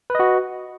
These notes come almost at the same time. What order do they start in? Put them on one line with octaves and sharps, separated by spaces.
B4 D#5 F#4